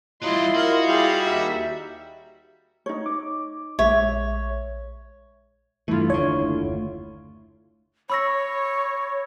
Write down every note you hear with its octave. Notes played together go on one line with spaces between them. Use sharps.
F#3 G3 E4 F4 D#5 C6
F#4 A#4
G3 G#4 F5
D#2 D#4 E5
D#4 C#5
D6
A#1 G#3 C#5 E5
G2 E3 A3 E4 F4
F#1 D#2 D3 C#5
C#5 B5 E6 A#6